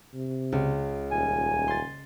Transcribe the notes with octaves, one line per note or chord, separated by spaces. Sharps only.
C3
C#2
D#1 G#5
C6 A6